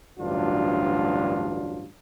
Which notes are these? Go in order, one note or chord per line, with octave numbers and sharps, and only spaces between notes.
A1 D2 G2 F#3 D4 F4